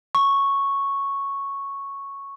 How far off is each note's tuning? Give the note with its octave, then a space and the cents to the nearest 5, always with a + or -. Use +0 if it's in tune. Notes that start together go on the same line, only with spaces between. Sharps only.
C#6 -5